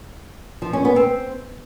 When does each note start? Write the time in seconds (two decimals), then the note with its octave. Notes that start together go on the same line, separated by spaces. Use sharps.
0.62 F3
0.73 C#4
0.85 B3
0.96 C4